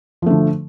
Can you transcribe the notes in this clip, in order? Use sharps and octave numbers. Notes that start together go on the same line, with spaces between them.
D3 F3 A3